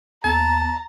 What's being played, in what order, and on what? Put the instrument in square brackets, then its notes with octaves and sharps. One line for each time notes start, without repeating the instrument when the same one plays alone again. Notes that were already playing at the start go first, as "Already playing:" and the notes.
[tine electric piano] D#2 B3 [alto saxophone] A5 [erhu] A#5